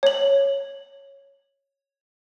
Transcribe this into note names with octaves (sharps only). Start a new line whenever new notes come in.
C#5 F#7